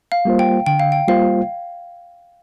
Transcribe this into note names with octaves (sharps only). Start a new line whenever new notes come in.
F5
G3 A#3 F4 C5
G5
D3 G5
F5
G5
G3 A#3 F4 C5 F5